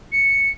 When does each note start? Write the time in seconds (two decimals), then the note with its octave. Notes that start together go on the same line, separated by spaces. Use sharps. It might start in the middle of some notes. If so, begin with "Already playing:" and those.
0.12 C#7